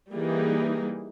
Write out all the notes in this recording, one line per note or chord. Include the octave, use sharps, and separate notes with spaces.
E3 G3 A#3 D#4 G#4